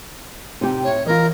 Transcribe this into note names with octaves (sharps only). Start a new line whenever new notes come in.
A2 C3 D#4 G4
A2 C#5 E5
E3 F4 A#4 D#5